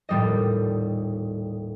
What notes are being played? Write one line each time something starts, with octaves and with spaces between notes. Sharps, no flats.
D#1 A2 G3 D5 D#5